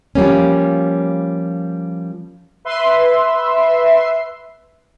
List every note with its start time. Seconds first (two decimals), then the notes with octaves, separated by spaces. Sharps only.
0.15 F3 G3 A#3 C#4
2.65 B4 E5 C6